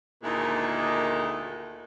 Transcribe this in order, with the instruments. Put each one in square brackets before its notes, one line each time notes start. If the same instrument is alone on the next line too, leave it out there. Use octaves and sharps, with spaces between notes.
[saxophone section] D2 A#2 D#3 G#3 D#4 E4